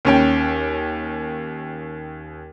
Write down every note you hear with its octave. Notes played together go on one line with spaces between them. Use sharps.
D#2 C#4 G5